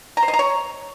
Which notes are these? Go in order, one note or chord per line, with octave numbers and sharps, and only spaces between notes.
A#5
C5
D#5
A#5
C#5